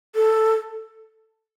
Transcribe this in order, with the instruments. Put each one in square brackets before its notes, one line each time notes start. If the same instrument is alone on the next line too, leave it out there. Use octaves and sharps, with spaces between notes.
[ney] A4